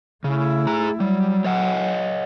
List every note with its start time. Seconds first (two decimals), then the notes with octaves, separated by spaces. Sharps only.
0.24 C#3 A3 E4
0.67 G#4 A#5
1.00 F#3 G3
1.44 C#5 D#5 F#5